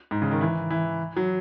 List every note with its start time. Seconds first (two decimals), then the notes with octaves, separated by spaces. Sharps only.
0.11 G#2
0.22 C#3
0.31 D#3
0.41 E3
0.70 E3
1.17 F#3